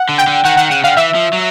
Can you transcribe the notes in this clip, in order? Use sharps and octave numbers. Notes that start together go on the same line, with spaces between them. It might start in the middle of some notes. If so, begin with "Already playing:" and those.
Already playing: F#5
D3
G5
D3
D#3 F#5
D#3 F#5
C#3 F#5
D3 F5
E3 E5
F3
F#3